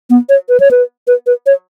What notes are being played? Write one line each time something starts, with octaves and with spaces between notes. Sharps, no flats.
B3
C#5
B4
C#5
B4
B4
B4
C#5